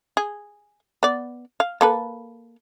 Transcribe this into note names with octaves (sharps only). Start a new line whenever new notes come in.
G#4
B3 D5
F5
A#3 A4 B4